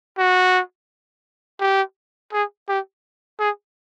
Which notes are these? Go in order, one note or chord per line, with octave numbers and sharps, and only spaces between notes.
F#4
G4
G#4
G4
G#4